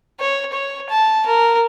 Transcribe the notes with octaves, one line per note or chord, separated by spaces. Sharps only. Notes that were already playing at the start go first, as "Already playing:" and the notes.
C#5
C#5
A5
A#4